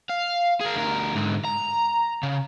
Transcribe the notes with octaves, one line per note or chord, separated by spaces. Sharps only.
F5
G#4 A#4
D2 A#4
G#2 D3
A#5
C#3